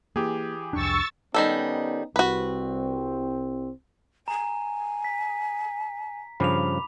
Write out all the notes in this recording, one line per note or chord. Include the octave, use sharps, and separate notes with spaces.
E3 A#3 G4 G#4
C2 F2 D4 C#6 E6 A6
D#3 G3 B3 C#4 D#4 A4
C2 C4 F#4 B4
G#5 A#5
B6
G2 C#3 F3 B5 D6 F7